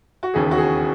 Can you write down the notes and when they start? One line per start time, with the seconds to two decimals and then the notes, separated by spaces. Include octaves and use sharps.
0.23 F#4
0.34 E1 D#2 C#3 G#4
0.51 F#4
0.58 G#4